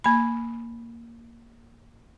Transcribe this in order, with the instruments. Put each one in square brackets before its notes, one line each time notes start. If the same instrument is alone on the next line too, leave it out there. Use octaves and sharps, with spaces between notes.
[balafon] A#3 B5